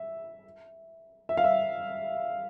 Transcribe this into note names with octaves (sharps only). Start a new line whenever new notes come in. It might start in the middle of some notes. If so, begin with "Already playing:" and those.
Already playing: E5
E5
F5
E5